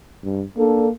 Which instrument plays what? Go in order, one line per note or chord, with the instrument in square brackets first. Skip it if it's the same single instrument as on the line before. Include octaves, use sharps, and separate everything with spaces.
[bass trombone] G2
[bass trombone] A#3 [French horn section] D4 A4